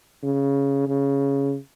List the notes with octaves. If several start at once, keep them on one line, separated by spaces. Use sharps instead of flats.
C#3
C#3